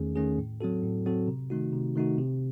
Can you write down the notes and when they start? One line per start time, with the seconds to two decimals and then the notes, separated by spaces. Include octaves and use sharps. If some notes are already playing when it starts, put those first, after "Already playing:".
Already playing: E2 D#3 A3 C#4 G#4
0.16 D#3 A3 C#4 G#4
0.38 A2
0.61 F#3 C4 F#4 A4
0.83 A2
1.06 F#3 C4 F#4 A4
1.28 C3
1.50 D#3 A3 D#4 F#4
1.73 C3
1.95 D#3 A3 D#4 F#4
2.18 C3